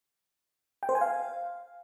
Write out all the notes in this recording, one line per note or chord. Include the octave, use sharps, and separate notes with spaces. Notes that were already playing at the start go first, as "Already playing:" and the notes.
G5
C5
G#5
F5